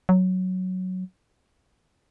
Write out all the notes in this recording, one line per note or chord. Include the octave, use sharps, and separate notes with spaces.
F#3